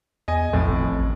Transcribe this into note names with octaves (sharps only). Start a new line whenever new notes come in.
E2 D#5 G#5
B1 F2 A2
G#1
A1